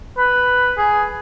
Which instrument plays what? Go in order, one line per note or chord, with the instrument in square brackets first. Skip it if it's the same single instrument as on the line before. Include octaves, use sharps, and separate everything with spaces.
[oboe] B4
G#4